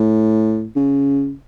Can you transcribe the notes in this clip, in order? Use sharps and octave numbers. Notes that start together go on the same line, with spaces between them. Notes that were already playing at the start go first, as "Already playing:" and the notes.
Already playing: A2
C#3